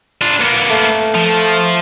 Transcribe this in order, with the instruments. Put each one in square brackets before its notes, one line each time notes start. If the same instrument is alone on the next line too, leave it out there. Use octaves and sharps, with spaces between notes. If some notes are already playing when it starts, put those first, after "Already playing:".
[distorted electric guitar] D4 F4
A#3 B3
[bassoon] A3
[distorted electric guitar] F3